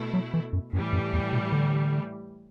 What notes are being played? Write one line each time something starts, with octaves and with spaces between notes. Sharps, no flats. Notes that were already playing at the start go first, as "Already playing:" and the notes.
Already playing: B2 A3 E4
F#3
E3
F#2
F#2 A2 E3 G3
F#2
E2
B2
D3